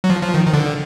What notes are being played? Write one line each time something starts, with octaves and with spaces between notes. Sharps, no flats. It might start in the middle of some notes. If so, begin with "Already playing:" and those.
F#3
F3
F3
D#3
D#3
D3